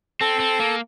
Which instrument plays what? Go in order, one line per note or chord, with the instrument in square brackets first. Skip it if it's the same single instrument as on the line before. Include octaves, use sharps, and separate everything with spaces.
[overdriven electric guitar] C4 [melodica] A4
[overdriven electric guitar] C4
A#3